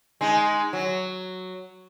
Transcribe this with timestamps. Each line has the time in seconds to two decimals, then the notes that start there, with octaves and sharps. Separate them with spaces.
0.21 G#3 D#4
0.73 F#3